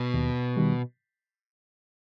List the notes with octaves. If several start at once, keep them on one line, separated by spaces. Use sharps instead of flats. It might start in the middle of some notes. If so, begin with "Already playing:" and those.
Already playing: B2
D#2
D#3 G3